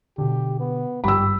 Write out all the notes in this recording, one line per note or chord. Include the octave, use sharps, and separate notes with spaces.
B2 D3 G4
B3
G#1 G2 G3 G4 B5 E6